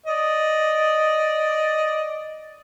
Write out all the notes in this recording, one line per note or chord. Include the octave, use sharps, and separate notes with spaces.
D5 D#5